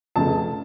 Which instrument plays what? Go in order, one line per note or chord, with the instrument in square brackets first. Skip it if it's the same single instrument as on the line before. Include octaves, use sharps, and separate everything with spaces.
[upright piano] F1 F2 C#3 A5